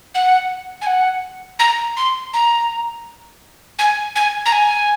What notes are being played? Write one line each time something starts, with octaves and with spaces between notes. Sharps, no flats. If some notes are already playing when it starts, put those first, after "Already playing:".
F#5
G#5
F#5
A#5
C6
A#5
G#5
G#5
A#5
G#5